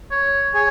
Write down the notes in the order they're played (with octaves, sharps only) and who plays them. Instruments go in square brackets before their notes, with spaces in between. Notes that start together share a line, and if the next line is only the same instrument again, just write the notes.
[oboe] C#5
[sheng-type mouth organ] G#4 [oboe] C#5